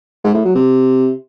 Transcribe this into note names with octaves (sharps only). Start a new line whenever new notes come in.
G#2
A2
F#3
C3